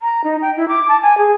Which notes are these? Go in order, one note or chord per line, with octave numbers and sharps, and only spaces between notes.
A#5
D#4
G5
E4
D6
A5
G#5
G#4